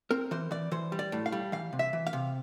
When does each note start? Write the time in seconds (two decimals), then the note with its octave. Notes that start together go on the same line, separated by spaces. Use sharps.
0.11 C4 A#4
0.31 E3 C5
0.51 E3 D5
0.72 E3 C5
0.92 G3
0.99 D5
1.12 A2
1.26 F5
1.32 G3
1.52 E3 F5
1.73 C3
1.79 E5
1.93 E3
2.07 F5
2.13 C3